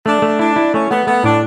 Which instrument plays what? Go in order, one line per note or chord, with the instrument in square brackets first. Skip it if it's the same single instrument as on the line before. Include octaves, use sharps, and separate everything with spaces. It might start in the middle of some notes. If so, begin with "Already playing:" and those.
[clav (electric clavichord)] A3 [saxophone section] D4
[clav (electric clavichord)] A3
[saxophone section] D4 [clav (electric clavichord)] E4
[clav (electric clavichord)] E4
[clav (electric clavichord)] A3 [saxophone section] C#4
[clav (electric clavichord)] A3 [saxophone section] B3
[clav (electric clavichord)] A3 [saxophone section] B3
[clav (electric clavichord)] A2 [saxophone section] D4